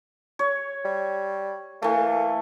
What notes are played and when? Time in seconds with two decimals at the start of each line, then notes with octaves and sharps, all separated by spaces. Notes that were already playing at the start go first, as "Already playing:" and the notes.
0.39 C#5
0.85 G3
1.82 E3 A3 A#3